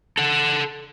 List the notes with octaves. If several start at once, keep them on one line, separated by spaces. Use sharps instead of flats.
A4 F#5